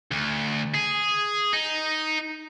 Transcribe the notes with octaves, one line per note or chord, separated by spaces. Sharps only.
D2
G#4
D#4